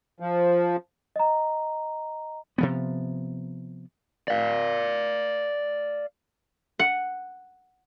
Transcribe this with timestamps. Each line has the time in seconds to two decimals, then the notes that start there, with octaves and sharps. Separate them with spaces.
0.20 F3
1.16 D#5 A#5
2.58 C3 F3 B3
4.28 D5 F5
6.79 F#5